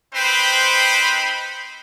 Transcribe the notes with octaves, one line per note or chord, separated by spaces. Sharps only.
C4 D#4 B4 C5 G5 B5